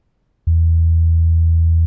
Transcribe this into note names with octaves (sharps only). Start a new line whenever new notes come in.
E2